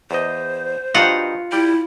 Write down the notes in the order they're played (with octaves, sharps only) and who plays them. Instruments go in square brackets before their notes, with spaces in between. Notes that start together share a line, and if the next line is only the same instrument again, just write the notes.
[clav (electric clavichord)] E2 D#5 [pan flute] C5
[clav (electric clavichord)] G2 D#4 F#4 [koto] F4 F#5
[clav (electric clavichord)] G3 G5 [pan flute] E4